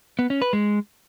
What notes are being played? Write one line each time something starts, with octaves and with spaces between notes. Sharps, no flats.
B3
C#4
B4
G#3